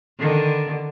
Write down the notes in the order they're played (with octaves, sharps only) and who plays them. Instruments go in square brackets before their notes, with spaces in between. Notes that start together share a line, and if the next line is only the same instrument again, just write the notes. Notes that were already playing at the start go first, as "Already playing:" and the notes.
[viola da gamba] D3 D#3